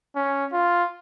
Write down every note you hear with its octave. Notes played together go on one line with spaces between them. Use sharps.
C#4
F4